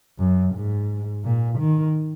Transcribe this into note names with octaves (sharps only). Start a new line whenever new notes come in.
F#2
G#2
A#2
D#3